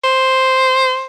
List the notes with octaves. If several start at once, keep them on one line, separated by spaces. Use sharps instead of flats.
C5